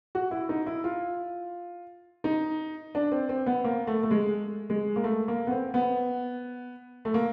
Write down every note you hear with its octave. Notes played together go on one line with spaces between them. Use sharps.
F#4
E4
D#4
E4
F4
D#4
D4
C4
C4
B3
A#3
A3
A3
G#3
G#3
A#3
A3
A#3
B3
C4
B3
A3
A#3